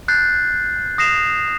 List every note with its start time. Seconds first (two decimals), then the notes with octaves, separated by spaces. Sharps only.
0.08 F#6 G6 A6 C7
0.98 D#6 A#6 C7 E7 F7